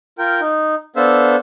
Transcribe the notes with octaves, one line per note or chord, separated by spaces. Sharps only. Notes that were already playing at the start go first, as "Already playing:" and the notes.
F4 A#4 G5
D#4
B3 D4 A4 C5 E5 F5